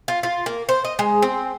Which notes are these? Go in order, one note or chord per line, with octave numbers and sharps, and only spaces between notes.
F4
F4
A#3
C5
D#5
G#3
C4